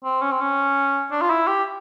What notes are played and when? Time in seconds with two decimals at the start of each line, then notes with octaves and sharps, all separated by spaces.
0.04 C4
0.22 C#4
0.32 C4
0.41 C#4
1.12 D4
1.21 F4
1.30 E4
1.48 G4